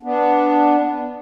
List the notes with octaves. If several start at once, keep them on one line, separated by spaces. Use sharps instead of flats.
B3 D4